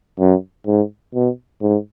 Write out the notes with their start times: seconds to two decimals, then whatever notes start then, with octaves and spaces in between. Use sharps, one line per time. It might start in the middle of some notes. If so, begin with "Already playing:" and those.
0.20 F#2
0.67 G#2
1.15 B2
1.62 G#2